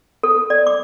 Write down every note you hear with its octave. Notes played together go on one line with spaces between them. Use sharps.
A4
D5
D6